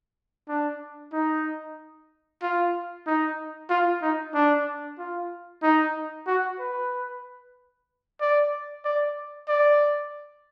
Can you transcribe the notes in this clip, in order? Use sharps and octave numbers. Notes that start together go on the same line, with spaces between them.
D4
D#4
F4
D#4
F4
D#4
D4
F4
D#4
F#4
B4
D5
D5
D5